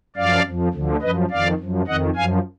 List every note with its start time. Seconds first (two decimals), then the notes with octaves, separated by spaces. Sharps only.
0.17 F#2 F3 D5 F5
0.45 F2 F3
0.74 D2 D3 F3
1.02 F#2 F3 B4 D#5
1.30 F2 D#3 D5 F5
1.60 F#2 F3
1.87 F2 D#3 D#5 F#5
2.16 F#2 F3 F5 G#5